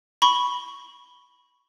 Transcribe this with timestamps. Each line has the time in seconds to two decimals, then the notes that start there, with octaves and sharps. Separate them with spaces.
0.22 B5 C#6 G7